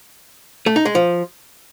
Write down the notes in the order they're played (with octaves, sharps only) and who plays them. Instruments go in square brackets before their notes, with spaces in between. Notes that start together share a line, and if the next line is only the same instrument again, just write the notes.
[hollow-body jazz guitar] A3
D#4
G#3
F3